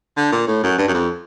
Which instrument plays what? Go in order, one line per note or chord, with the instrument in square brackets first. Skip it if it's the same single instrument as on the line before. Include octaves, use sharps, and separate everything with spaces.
[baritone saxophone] D3
A#2
A2
F#2
G2
F#2
F2